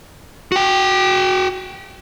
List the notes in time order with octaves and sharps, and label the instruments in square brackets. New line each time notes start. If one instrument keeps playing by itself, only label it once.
[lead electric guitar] F#4 G5